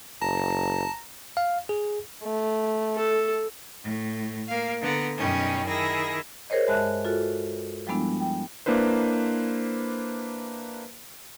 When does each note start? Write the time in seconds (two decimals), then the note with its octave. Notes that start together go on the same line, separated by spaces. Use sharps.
0.22 F#1 A5 A#5
1.37 F5
1.69 G#4
2.23 A3
2.96 A4
3.82 A2
4.47 A#3 F5
4.81 D3 B3 A#5
5.17 F#2 B2 G3 C#4 D#4
5.65 D#3 E4 G#4 A#6
6.50 G#4 A#4 C5 C#5 D#5
6.68 G2 G#3 E5 A5 F#6
7.05 F4 F#4 A4
7.87 F3 G3 G#3 B3 D4 E4
8.20 G5
8.66 A#3 D4 E4 B4 C5